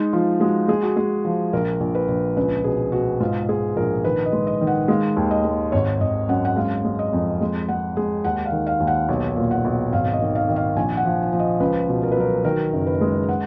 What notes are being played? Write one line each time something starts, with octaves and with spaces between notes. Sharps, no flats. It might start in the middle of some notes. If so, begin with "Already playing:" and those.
Already playing: G#3 D#4
F3 F4
G#3 F#4
G#3 G#4
F#4
G#3 G#4
F3
A#1 A#4
A#1
B4
A#1
C#2 B4
B2 G#4
B2 F#4
G#2 F4
G#3 G#4
A#1 A#4
D#3 B4
D#5
G#3
D#5
D#3
F#5
G#3 F5
D#2
D#5
G#3
G#1 C#5
G#1 D#5
F#2 F#5
F#5
G#3 F5
G#3
D#5
F2
G#3
G#3 F#5
G#3 G#4
D#2 F#5
F5
D#3
F5
D#2
F#5
B1
A#2
F#5
B1
G#1 F5
D#5
D#3
F5
D#3
F5
A#1 G#5
F#5
F3
F3
D#5
C#2 B4
B2
A#4
B4
F#3 A#4
D#3 A#4
F#1
B4
G#3
F#5